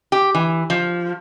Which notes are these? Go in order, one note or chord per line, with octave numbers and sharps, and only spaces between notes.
G4
E3
F3